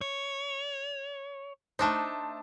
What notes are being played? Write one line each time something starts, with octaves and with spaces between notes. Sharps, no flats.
C#5
A3 D4 D#4 C5 A5